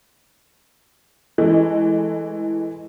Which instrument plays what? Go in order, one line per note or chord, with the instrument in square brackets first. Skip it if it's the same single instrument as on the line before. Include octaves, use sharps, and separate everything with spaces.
[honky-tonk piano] E3 G#3 A3